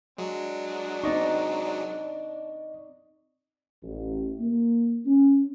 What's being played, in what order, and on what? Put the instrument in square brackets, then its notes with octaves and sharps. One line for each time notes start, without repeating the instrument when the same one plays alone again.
[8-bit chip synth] F#3 G#3 [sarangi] D4
[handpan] C4 D#4 [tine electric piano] D5 D#5 C#6
[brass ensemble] A1
A#3
C#4